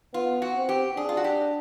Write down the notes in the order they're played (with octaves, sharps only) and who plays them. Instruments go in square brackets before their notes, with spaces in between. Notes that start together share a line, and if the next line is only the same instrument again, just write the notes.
[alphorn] B3 [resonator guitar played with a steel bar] F4
[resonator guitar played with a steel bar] F#4
[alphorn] C4
[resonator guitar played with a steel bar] G4
[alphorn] D4 [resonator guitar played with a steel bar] G#4
[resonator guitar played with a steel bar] F4
F#4
G4